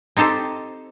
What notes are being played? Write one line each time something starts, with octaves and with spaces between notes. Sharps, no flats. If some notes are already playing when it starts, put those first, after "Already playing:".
C4 D#4 G4 A4 C5